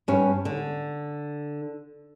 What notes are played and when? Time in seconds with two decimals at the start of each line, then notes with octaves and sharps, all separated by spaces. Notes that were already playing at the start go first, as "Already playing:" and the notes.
0.08 G2 C#4
0.45 D3